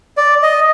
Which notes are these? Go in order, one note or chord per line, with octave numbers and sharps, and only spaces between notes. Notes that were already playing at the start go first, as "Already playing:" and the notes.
D5
D#5